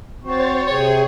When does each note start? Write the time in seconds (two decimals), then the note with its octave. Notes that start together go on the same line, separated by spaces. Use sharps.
0.23 C4 F#4 C5 C#5 A6
0.68 C3 G#4 C#5 G5